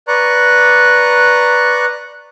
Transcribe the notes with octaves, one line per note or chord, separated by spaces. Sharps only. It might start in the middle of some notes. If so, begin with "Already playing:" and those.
B4 D5 A#5 C#6 F#6